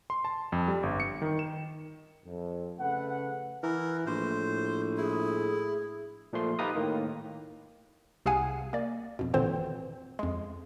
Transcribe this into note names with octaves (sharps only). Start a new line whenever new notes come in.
C6
A5
F2
G3
G1
C#7
D#3
E7
F2
C#3 A3 B4 F#5
E3 A#4
A#1 A2 C5
E4 G#4
A#2 F3 A3 C6
D#4 F4 G4 B4 A#5 D#6
A2 D#3 A#3
C2 C3 G#4 F5 F#5 G#5
A#3 D5
F2 B2
G#1 A#2 D3 E3 C4 C5
F2 G#3